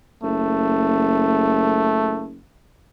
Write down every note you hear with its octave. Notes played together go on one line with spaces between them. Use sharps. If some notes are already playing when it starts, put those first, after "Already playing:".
F#1 A3